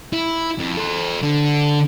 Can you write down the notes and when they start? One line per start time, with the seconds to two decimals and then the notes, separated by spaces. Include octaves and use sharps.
0.13 E4
0.58 F2
0.77 A4 C5
1.23 D3